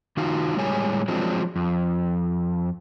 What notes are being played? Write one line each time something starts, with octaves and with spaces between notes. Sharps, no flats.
D#3 D#4 F4 F#4
A2 G3 G#3 C#5 G#5
F3 F#3 G#3 C4 D4
F2